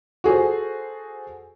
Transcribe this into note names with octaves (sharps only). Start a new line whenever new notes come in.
F#4 G#4 A4 C5